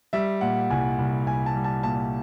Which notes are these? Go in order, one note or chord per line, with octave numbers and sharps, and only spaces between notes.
G3 E5
A#2 F#5
C2 G#5
C2
C2 G#5
A5
G3
A5
A#2 A5